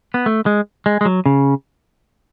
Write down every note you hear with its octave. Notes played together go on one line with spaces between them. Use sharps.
B3
A3
G#3
G#3
G#3
F#3
C#3